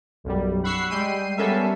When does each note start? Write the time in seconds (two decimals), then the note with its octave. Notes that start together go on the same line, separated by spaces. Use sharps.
0.24 B1 F#2 G3
0.63 F#5 B5 C#6 E6 C7
0.90 G3 G#3 G5 C7 D#7
1.37 G3 B3 C#4 A4 A#4 E5